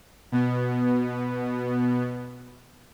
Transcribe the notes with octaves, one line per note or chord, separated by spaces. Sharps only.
B2 B3